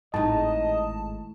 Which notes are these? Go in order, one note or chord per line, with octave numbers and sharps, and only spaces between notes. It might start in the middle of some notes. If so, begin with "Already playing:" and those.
G#1 A2 G#3 D#4 D#5 A5